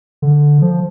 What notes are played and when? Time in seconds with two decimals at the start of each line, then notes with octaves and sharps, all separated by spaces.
0.22 D3
0.62 F3